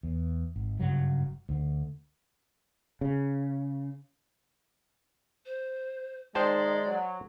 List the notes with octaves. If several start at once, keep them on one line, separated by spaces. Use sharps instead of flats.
E2
G#1
F#1 G2 C#3 F#3
D2 D3
C#3
C5
D#3 G#3 D#4 C5 D5 G5 A5
F#3